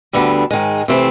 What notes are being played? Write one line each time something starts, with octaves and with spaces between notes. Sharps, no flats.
D2 D3 G3 B3 D4
G#2 D#3 G#3
C3 E3 A3 C4